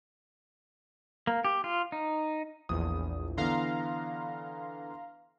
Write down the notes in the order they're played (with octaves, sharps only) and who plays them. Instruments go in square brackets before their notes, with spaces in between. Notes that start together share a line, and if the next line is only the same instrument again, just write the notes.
[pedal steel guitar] A#3
G4
F4
D#4
[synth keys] A#1 E2 [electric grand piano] D#6
[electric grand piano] D3 E3 B3 [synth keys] F5 A#5 C6